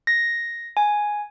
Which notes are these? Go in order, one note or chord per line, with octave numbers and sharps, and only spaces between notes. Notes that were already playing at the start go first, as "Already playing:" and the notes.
A#6
G#5